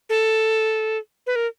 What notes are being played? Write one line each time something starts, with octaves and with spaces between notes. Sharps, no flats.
A4
B4
A#4